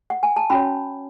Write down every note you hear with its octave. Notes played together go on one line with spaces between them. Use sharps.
F#5
G#5
A5
C#4 F#4 C#5 B5